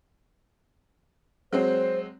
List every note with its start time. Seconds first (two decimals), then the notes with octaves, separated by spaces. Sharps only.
1.53 F#3 G#3 C4 C5